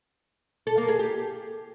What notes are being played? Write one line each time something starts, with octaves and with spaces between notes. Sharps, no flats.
A4
A#3
G#4
G4